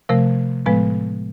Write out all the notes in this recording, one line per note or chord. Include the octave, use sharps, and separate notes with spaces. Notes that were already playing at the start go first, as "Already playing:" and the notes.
C3 F3 A3 A#4
A2 F3 G#3 B3 B4